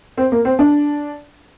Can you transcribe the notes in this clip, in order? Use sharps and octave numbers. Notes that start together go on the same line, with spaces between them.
C4
A#3
C4
D4